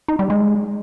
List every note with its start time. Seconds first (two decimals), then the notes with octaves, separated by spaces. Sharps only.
0.08 D#4
0.19 G3
0.30 G#3